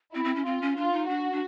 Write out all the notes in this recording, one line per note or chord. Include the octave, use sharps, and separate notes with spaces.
C4 E4
C4
C#4
C4 F4
C#4
D4 F4
D#4
D4 F#4
D4